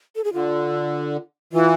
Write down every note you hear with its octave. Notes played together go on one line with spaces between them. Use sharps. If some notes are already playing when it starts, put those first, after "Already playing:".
A4
G#4
D3 F4
E3 F4